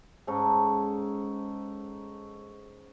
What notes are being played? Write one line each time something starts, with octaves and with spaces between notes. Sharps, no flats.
G#2 C#4 A4 A#5